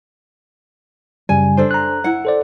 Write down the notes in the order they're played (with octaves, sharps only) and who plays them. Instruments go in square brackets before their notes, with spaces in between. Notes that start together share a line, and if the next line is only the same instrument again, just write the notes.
[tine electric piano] F#2 C#3 G3 [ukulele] G#5
[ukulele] D4 A4 C5
[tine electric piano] A#5 F#6
[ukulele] E4 F#5
[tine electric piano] A4 C5 D5